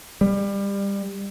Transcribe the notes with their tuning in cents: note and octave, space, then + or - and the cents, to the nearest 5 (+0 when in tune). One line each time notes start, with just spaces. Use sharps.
G3 +25